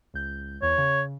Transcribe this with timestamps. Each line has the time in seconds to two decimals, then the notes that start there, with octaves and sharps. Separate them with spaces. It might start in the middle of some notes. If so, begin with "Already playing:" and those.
0.14 C#2 G6
0.62 E2 C#5
0.78 C#3